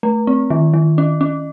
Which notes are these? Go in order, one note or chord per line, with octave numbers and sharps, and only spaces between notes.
A3
C4
D#3
D#3
C#4
C#4